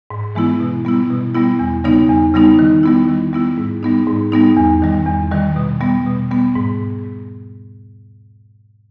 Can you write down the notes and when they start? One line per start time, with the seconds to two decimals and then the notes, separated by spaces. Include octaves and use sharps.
0.10 G#2
0.35 E3 G#3 B3 E4
0.60 B2
0.85 G3 B3 E4
1.10 B2
1.34 G3 B3 E4
1.59 E2
1.84 C#3 G3 B3 D#4
2.09 E2
2.34 C#3 G3 B3 D#4
2.59 D#3
2.83 G3 B3 E4
3.08 D#3
3.33 G3 B3 E4
3.58 G#2
3.83 G3 B3 D#4
4.07 G#2
4.32 G3 B3 D#4
4.57 E2
4.82 D#3 G3
5.07 E2
5.31 D#3 G3
5.56 B2
5.81 G3 B3
6.06 B2
6.31 G3 B3
6.55 G#2